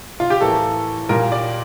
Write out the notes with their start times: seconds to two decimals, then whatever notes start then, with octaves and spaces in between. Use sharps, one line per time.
0.20 F4
0.30 G4
0.41 A2 E3 A#3 A4
1.09 A#2 G3 A#3 A#4
1.32 D5